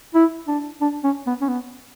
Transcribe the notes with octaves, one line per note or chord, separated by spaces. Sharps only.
E4
D4
D4
C#4
B3
C#4
B3